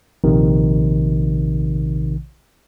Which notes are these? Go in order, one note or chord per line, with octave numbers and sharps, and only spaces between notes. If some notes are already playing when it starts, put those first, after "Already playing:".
A#1 C3 D#3